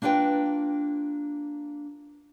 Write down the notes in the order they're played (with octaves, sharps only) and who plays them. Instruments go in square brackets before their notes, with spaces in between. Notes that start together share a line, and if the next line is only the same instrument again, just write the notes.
[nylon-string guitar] A#3 D4 F4 B4 G5